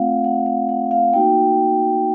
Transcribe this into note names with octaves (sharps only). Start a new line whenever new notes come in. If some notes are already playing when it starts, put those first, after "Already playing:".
Already playing: A3 C4 F4 F5 F#5
F#5
F5
F#5
F5
A#3 D#4 F#4 G5